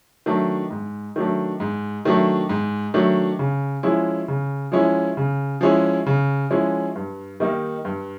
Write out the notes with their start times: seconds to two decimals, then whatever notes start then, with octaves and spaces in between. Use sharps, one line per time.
0.26 D#3 F#3 A3 D4
0.70 G#2
1.16 D#3 F#3 A3 D4
1.60 G#2
2.05 D#3 F#3 A3 D4
2.49 G#2
2.94 D#3 F#3 A3 D4
3.39 C#3
3.83 F3 G#3 C#4 E4
4.28 C#3
4.72 F3 G#3 C#4 E4
5.17 C#3
5.61 F3 G#3 C#4 E4
6.06 C#3
6.51 F3 G#3 C#4 E4
6.96 G2
7.40 D#3 G3 A#3 D#4
7.85 G2